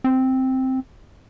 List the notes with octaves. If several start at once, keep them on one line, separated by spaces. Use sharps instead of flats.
C4